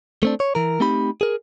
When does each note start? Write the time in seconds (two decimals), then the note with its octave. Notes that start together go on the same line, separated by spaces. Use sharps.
0.23 A3 C4 D4
0.40 C#5
0.55 E3 A#4
0.80 A3 C4 D#4 G4 B5
1.21 G#4 A#4